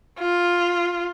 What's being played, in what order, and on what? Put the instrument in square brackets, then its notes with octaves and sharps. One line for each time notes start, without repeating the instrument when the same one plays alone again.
[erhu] F4